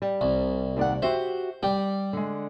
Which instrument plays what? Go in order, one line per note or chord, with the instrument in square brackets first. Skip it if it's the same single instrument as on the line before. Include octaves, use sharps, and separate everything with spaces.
[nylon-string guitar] G3
[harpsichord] C2
[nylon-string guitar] D#2 D5 F#5
[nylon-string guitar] F#4 G4 E5 [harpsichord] C5
[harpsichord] G3 [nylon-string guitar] G5
[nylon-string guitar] D3 G#3